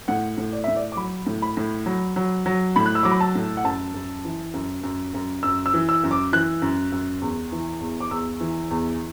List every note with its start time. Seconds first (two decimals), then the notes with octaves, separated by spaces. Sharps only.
0.08 A2 F#5
0.38 A2
0.52 D5
0.64 A2 E5
0.76 D5
0.92 D6
0.97 F#3 B5
1.27 A2
1.42 B5
1.57 A2
1.86 F#3
2.16 F#3
2.46 F#3
2.76 A2 B5
2.86 F#6
2.95 E6
3.03 F#3 D6
3.11 B5
3.21 A5
3.35 A2
3.57 F#5
3.64 F#2 A5
3.95 F#2
4.25 E3
4.54 F#2
4.83 F#2
5.14 F#2
5.43 F#2 E6
5.66 E6
5.74 E3
5.89 E6
6.04 F#2
6.11 D6
6.33 E3 F#6
6.62 F#2
6.92 F#2
7.21 E2
7.52 E3
7.81 E2
8.01 D6
8.11 E2 E6
8.40 E3
8.70 E2